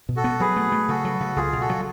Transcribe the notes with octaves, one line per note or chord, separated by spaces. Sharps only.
B2
F#4 A4
B3
F#3 G#4 B4
A3
A3
C#3 F#4 A4
F#3
C#3
C#2 F4 G#4
B2
F#4 A4
F#3